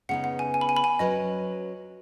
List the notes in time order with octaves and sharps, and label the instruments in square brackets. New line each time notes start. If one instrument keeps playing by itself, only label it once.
[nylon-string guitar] C#3 B3 D#4 [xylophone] F#5
[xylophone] F#5
G#5
G#5
B5
G#5
B5
G#5
[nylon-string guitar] F#3 C#4 B4 [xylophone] D#5